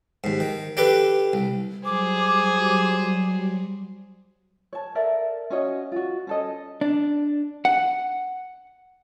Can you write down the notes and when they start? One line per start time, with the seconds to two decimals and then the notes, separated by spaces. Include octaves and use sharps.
0.24 D#2 G#2
0.40 D#3
0.77 D4 G4 A4 B4
1.33 C2
1.85 F#3 G3 G#4 C5 D6
4.73 C#5 A5
4.95 A4 A#4 D5 E5
5.50 C#4 F#4 C#5 D#5
5.92 F4 F#4
6.27 C#4 A4 D#5
6.81 D4
7.65 F#5